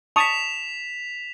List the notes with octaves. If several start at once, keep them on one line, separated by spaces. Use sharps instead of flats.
A5 C#6 D#6 B6 E7 F7